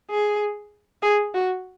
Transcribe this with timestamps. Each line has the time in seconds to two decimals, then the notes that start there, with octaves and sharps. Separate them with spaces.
0.10 G#4
1.03 G#4
1.34 F#4